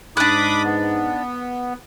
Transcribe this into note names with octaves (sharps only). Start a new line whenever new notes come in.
G#2 D4 D#4 B5 D6 D#6 F#6
B3